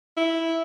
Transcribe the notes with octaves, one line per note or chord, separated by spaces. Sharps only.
E4